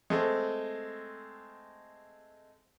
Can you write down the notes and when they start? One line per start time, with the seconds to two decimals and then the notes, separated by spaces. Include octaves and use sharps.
0.10 G#3 A3 C4